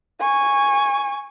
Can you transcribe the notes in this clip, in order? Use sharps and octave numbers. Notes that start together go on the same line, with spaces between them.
G#5 C#6